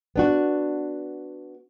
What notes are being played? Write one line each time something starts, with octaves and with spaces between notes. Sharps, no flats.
B3 D4 F#4